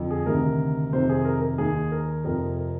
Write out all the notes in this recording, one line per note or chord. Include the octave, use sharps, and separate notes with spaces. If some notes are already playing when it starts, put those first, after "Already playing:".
Already playing: F2 D3 F3
G#4
D2 C3 D#3 A#4
F2 C3 D#3 C5
G#4
A#4
A#4
D#2 D#3 G#4
A#4
F2 C3 F3 A#4
A#4